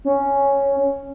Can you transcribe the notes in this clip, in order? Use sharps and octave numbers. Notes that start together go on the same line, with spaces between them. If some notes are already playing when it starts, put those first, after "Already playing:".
C#4